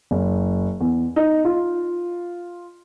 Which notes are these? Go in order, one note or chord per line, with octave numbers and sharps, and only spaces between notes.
F#1
E2
D#4
F4